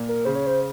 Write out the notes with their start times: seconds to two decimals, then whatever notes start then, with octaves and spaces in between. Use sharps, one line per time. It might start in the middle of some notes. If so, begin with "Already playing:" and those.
Already playing: A#2
0.09 A#4
0.25 C#3 C5
0.36 C#5
0.47 C5